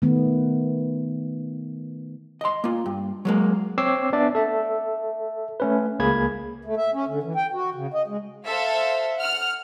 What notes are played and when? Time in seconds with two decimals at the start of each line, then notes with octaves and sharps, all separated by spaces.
0.02 D#3 A3 B3
2.41 D#5 C6
2.64 A#3 F4
2.86 G2
3.25 F#3 G#3 A#3
3.78 C4 C#5 D6 E6 C7
4.13 B3 D4 D5 E5
4.35 A4 E5
5.60 A3 C#4 B4
5.99 C#2 A#3 G#4 B5 G#6
6.65 A3
6.77 E5
6.93 C#4
7.08 D3
7.23 E3
7.36 G5
7.53 F#4
7.75 C#3
7.94 D#5
8.07 G#3
8.47 A4 C5 E5 F5
9.18 F#5 F6